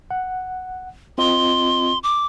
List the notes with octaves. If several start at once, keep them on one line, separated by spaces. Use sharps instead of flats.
F#5
C4 F4 D#5 C6
D6